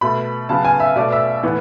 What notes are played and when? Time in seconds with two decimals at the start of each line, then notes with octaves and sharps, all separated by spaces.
0.01 B2 A3 B5
0.49 C#3 F#3 B3 A5
0.65 G#5
0.80 E5
0.96 B2 A3 D5
1.12 E5
1.43 A2 E3 B3